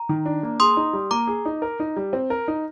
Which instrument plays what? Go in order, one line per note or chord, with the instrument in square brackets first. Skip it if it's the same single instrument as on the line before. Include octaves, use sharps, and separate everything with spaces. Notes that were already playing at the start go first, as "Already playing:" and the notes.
Already playing: [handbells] A#5
[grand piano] D#3
D4
A#3
[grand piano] G#4 [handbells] C6 D#6
[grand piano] D#4
G3
[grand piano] A#3 [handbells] A#5 D6
[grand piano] G#4
D#4
A#4
D#4
G3
C4
A#4
D#4